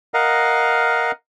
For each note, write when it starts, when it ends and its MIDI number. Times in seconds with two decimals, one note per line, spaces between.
0.14 1.11 70
0.14 1.11 75
0.14 1.11 77
0.14 1.11 78